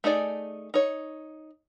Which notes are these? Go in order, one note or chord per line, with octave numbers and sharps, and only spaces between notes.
A3 D#4 G#4 D5
D#4 C#5